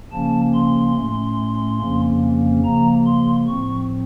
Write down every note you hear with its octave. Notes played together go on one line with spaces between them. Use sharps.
C#3 F3 A#3 C#4 A5
C6
A2 A3 C#4
F2 C#3 F3 A#3 C#4
C#3 F3 A#3 A#5
C6
A2 F3 C4 C#6